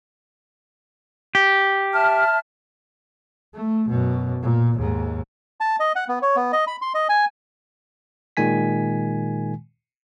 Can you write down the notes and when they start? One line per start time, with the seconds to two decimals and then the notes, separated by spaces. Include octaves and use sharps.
1.35 G4
1.93 E5 A5 F6
3.54 A3
3.89 F#2 B2
4.42 A#2
4.75 D#2 G#2
5.60 A5
5.80 D#5
5.96 F#5
6.08 B3
6.22 C#5
6.36 B3
6.53 D#5
6.67 B5
6.82 C6
6.94 D#5
7.09 G#5
8.37 A#2 D#3 G#3 G#5 B6